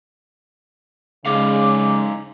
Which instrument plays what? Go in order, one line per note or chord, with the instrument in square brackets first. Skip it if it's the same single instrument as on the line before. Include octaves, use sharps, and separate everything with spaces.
[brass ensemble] C#3 G#3 [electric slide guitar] D#4 G#4 F5 [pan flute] D6